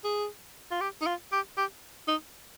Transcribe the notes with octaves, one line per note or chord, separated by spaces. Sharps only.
G#4
F4
G4
D#4
F4
G4
G4
D#4